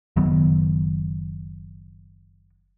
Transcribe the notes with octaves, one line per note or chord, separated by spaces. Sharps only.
F#1 D#3 F#3 B3